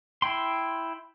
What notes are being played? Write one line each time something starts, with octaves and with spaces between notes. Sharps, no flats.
E4 G5 C6